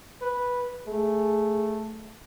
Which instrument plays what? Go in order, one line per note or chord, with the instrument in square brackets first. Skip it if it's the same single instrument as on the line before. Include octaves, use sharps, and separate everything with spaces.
[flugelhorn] B4
[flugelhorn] A3 [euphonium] G#4